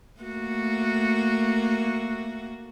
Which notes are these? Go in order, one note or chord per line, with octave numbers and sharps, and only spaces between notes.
A3 A#3 F#4